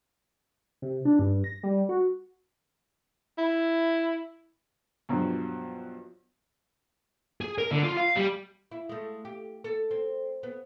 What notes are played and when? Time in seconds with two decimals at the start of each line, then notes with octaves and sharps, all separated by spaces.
0.82 C3
1.05 D4
1.19 G2
1.44 A#6
1.63 G3
1.89 F#4
3.38 E4
5.09 G2 B2 F3 F#3
7.41 G#4
7.58 A#4
7.71 D3
7.83 F4
7.97 F5
8.16 G3
8.71 E4
8.89 G#3 A3
9.25 G4
9.64 A4
9.91 C4
10.43 B3